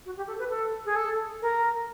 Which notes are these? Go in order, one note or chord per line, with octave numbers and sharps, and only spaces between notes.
F#4
G4
A4
B4
A4
G#4
A4
A#4